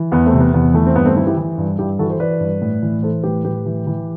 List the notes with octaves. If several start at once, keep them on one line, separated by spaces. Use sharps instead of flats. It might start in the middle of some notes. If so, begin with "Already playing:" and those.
Already playing: E3
E2 B3
A3 C4
C3
B3
E2 B3
E3 A3
C4
G2 B3
A3 C4
E3 C4 E4
E4 G4
E3
G2
G2 E4 G4
E3 F#4 A4
A4 C5
E3 B4 D5
G2
A2
E3
E3 A4 C5
A2 G4 B4
A2 G4 B4
E3
E3